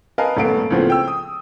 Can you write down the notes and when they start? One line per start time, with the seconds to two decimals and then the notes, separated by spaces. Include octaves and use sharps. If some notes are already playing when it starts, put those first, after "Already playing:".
0.18 A#4 B4 D#5 F5 G#5 A5
0.37 D#1 A3 B3 F5 D7
0.70 C#2 A2 F3 B3 C4
0.90 G5 E6
1.08 D#6